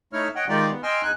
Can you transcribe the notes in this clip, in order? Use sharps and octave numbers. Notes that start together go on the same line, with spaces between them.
A3 D#4 E4 C#5 F6
C#5 D#5 F#5 G5
D#3 G#3 D#4 F4 G4 D5
B3
D#5 G5 G#5 C6 E6 F6
E2 D#4 G#5 F#6